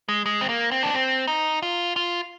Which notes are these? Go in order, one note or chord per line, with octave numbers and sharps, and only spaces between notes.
G#3
G#3
C4
A#3
C4
D4
C4
D#4
F4
F4